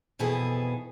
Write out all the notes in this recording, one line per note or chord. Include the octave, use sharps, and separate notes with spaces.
F2 B2 E3 G#4 A4